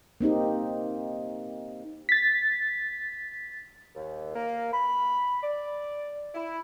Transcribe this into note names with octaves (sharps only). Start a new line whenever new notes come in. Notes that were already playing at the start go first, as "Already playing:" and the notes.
A#3 C4 D#4 G4
A6 B6
D#2
A#3
B5
D5
E4